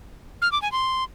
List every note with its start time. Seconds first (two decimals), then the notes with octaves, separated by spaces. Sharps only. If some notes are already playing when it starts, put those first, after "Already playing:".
0.42 F6
0.52 D6
0.62 G#5
0.72 C6